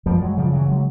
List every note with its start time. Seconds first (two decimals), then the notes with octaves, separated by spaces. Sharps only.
0.05 F#2 F3 G3
0.22 F#3 G#3
0.37 C#3 F3 G3
0.53 E3 F#3
0.69 F#3 G#3